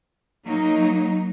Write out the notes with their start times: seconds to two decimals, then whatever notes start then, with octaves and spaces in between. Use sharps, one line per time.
0.46 F#3 A#3 D#4